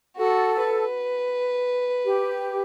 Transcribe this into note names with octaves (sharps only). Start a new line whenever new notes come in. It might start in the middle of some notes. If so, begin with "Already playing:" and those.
F#4 A4
B4
G4